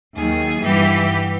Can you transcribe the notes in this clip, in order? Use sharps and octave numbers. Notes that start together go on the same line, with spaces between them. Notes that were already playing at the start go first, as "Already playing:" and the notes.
D#2 D#3 F#3 G#4
G2 E3 G3 B3 G4